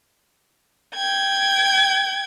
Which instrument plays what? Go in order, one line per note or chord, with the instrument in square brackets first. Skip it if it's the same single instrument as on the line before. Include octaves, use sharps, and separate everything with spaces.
[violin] G5 G#6